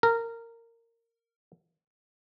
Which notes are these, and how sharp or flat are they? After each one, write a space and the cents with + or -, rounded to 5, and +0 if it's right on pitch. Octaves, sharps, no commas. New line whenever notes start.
A#4 -15